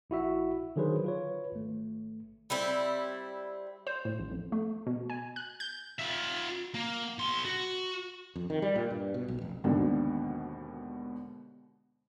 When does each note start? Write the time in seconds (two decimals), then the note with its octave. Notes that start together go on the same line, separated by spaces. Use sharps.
0.10 A#1 E4 F#4 E5
0.76 D3 D#3 F#3 G#4 B4 C5
1.04 F4 B4 C#5
1.52 G#1 A3
2.50 G3 C4 E4
3.87 C5
4.05 A2
4.20 A1
4.31 F2
4.52 A3
4.87 B2
5.10 G#5
5.36 F#6
5.60 G6
5.99 F4 E5
6.75 A#3
7.18 B1 C6
7.45 F#4
8.36 F2
8.50 D#3
8.62 G3
8.75 A#2
8.90 G2
9.14 B2
9.28 B1
9.42 F1
9.64 G#1 D#2 B2 D3